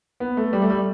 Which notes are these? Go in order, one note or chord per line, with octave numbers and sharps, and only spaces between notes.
B3
A3
G3
A3
G3